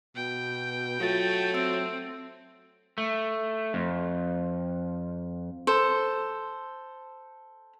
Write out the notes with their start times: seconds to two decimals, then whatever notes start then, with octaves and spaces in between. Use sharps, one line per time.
0.16 B2 G5
1.00 F#3 A3 F4 A6
1.54 C4 E5 E6 D7
2.98 A3
3.74 F2
5.67 A4 C5